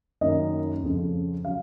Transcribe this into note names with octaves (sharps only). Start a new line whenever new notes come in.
F#2 D#3 A#3 D#5
F2 C#3 F3
C#3 F#3 F5